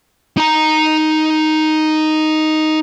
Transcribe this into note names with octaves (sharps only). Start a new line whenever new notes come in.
D#4 A#5